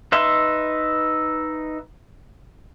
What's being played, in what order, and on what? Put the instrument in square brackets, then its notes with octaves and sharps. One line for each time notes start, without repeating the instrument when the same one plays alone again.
[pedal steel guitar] D#4 B4 E5 C6